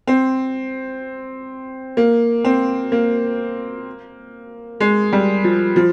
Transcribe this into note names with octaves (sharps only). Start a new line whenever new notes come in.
C4
A#3
C4
A#3
G#3
G3
F3
F3